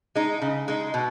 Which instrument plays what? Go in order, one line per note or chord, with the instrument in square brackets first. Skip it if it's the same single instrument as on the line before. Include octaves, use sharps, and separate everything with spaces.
[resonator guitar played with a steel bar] G#3 D#4
C#3
G#3 D#4
B2